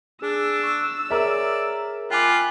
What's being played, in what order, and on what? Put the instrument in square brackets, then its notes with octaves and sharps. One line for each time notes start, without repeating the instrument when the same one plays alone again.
[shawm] D4 [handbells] G#4 [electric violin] E6
[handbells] C#6
[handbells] G#4 C#5 [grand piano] A#4 E5 [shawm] D5
[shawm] F4 [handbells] G5 G#5 D6 [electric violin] B5 F#6